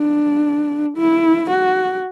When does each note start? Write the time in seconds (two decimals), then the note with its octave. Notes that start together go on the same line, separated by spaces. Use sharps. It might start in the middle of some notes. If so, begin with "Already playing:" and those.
Already playing: D4
0.97 E4
1.50 F#4